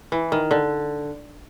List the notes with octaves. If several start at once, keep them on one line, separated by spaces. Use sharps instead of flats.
E3
D#3
D3